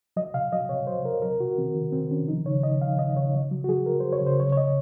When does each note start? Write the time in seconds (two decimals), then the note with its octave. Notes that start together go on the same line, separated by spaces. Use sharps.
0.16 F#3 D#5
0.34 C3 F5
0.52 F#3 D#5
0.69 C3 C#5
0.87 F#3 C5
1.05 C3 A#4
1.22 C3 A#4
1.40 C3 F#4
1.58 D#3 C4
1.75 D#3
1.92 C3 C4
2.10 D#3 C#4
2.28 F3 D#4
2.45 C#3 C#5
2.63 C#3 D#5
2.81 F3 F5
2.99 C#3 D#5
3.16 C#3 C#5
3.34 F#3
3.51 F#3
3.64 F#4
3.68 F#3 G#4
3.86 F#3 A#4
4.00 F#3 C5
4.13 C#5
4.22 C#3 C5
4.40 C#3 C#5
4.52 C#5
4.57 F#3 D#5